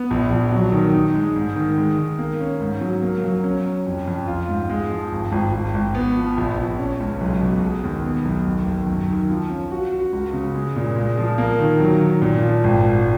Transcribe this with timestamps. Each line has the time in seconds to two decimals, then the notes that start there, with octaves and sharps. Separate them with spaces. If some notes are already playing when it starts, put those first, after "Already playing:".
Already playing: B3
0.11 A#1
0.31 A#1
0.52 F#3
0.72 D#3
0.93 D#4
1.15 G#3
1.36 G#2
1.56 D#3
1.78 G#3
1.98 D#3
2.18 A#3
2.41 C#4
2.61 G#2
2.81 F#3
3.02 A#3
3.24 F#3
3.44 C#4
3.66 C#4
3.86 F2
4.08 F2
4.28 F4
4.48 G#2
4.70 G#3
4.90 F3
5.12 G#1
5.32 G#1
5.53 G#1
5.74 G#1
5.95 B3
6.17 F3
6.38 A#1
6.58 A#1
6.79 C#4
7.00 C#2
7.21 B1
7.42 B2
7.63 G#3
7.84 D#2
8.04 B3
8.25 B1
8.46 D#2
8.66 D#2
8.87 F#2
9.08 D#3
9.30 F3
9.50 C#4
9.72 F#4
9.92 F#4
10.13 C#2
10.33 C#3
10.55 G#3
10.76 A#2
10.96 G#3
11.18 F3
11.38 A#3
11.60 D#3
11.80 F#3
12.01 D#3
12.22 A#2
12.42 F3
12.64 G#1
12.84 G#2